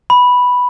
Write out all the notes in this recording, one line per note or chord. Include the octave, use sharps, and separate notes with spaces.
B5